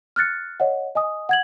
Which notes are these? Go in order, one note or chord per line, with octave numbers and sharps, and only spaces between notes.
F6 F#6 A6 C#7
C#5 D#5 F#5
D#5 G#5 D#6
F#5 G#6 F#7